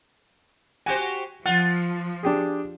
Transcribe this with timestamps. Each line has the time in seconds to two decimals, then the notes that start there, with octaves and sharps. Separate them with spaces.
0.86 F#4 G4 C5 G#5
1.46 F3 F4 F#5
2.23 D4 G4 G#4